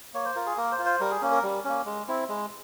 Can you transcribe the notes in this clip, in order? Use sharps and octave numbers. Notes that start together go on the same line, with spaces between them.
A#3 C#5
C5
F4 A#4
G#4
A#3 A#4
C5
F4
C5
G3 A#4
G#4
A#3 C#4
A#4
G3
A#3 C#4
G#3
C4 E4
G#3